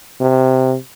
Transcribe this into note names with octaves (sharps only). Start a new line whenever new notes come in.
C3